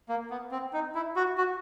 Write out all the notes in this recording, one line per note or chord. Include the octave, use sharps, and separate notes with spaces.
A#3
B3
C4
D#4
E4
F#4
F#4